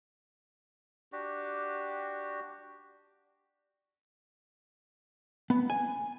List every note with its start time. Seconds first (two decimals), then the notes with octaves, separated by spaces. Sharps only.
1.12 D4 F#4 G4
5.50 B3
5.70 G#5